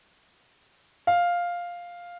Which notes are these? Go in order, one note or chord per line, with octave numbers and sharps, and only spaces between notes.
F5